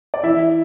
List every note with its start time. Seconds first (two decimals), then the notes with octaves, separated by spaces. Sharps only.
0.14 D5
0.23 E3 E4 E5